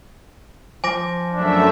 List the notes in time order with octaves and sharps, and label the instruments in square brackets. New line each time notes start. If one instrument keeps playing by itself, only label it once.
[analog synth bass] F3 [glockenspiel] G#5 D6 A#6
[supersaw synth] F#2 A3 E5 [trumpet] D4